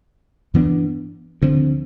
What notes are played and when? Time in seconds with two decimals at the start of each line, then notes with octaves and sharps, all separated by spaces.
0.54 G2 E3 B3 D4
1.42 D2 D3 F3 C4